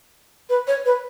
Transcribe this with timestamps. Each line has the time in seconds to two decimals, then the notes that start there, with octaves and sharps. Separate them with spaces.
0.49 B4
0.67 C#5
0.85 B4